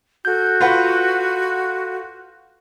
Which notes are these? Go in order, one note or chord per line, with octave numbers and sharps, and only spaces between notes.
F#4 A4 G6
F4 B4 F#5